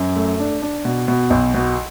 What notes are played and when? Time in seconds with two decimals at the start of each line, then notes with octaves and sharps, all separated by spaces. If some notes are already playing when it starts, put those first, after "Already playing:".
Already playing: F#2
0.16 A3
0.40 D4
0.62 D4
0.85 B2
1.08 B2
1.30 B1
1.54 B2